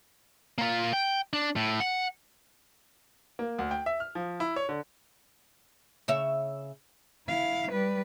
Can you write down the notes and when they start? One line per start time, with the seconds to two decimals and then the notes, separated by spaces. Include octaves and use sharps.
0.58 A#3 F4
0.93 G5
1.33 D4
1.56 A2
1.80 F#5
3.39 A#3
3.59 D2
3.71 G5
3.86 E5
4.00 F6
4.15 F3
4.40 E4
4.56 C#5
4.69 D3
6.08 C#3 C#5 E5
7.28 E4 F5
7.71 G3 B4